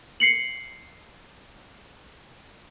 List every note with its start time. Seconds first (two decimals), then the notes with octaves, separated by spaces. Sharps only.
0.20 C7 C#7 F#7